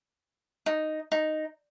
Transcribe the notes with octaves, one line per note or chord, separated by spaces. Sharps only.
D#4
D#4